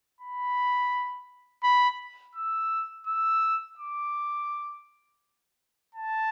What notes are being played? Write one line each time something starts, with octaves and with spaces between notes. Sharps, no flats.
B5
B5
E6
E6
D6
A5